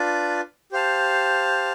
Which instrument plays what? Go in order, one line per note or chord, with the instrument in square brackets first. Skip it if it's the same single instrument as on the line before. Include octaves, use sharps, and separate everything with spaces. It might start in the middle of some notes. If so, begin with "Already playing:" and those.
Already playing: [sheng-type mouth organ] D4 F4 B4 D5
G4 C5 F5 A5